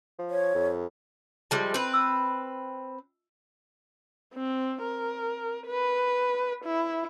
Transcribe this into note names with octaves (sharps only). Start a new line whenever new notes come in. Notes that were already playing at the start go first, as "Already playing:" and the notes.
F3
C#5
F2
F3 G3 G#3 D#5 E5 A5
C4 F4 B4
E6
C4
A#4
B4
E4